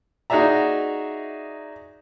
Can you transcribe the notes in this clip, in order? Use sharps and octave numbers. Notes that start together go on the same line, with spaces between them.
D#4 F#4 G#4 D5 E5 A#5